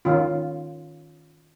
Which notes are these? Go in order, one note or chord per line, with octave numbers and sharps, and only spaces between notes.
D#3 C#4 F4